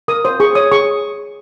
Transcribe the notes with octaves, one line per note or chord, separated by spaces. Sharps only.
A#4 D#6
C5 D#6
G#4 C#6
C#5 D#6
G#4 C#6